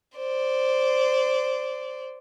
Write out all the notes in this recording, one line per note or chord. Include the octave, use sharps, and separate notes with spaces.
C5 D5